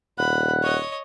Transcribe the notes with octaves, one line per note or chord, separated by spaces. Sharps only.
D#1 F#5 B5
C#5 D#5